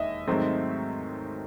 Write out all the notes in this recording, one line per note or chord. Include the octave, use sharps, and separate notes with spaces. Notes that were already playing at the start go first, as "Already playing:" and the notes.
Already playing: E1 D#2 D#3 D#5 E5
G#2 D#3 F#3 A3 C4